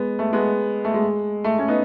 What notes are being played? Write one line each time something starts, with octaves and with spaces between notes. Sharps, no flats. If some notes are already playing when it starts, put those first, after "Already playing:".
Already playing: G#3 B3
A3
G#3 B3
A3
G#3
A3
A3 C#4
B3 D#4